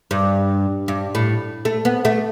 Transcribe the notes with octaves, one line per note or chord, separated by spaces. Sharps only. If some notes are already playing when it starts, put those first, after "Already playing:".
G2
G2
A2
A3
B3
A3